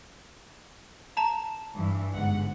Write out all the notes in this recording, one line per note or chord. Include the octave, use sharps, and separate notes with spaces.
A5 A#5
G2 E3
G1 G#2 F#5